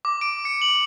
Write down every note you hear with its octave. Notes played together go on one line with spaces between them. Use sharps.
D6
D7
C#7
F#7